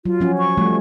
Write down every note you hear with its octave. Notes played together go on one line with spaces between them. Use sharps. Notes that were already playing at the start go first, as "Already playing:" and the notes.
F#3 F4
F3 C#4 F#4
C#6
F3 G3 A3